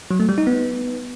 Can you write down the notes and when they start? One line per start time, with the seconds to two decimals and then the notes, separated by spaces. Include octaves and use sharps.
0.11 F#3
0.20 A3
0.29 G3
0.38 D#4
0.47 B3